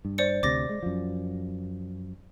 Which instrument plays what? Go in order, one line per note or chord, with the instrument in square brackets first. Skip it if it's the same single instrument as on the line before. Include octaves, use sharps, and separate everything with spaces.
[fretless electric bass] G2
[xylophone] C5 D5 C#7
[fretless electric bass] D2 C3 [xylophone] D6 A6 A#6
[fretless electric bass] G#3
F#2 F3